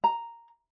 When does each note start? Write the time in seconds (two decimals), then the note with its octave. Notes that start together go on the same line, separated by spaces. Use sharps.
0.04 A#5